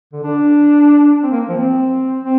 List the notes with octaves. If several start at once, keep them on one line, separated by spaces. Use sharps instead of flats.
D3
D4
C4
A#3
F3
C4
C4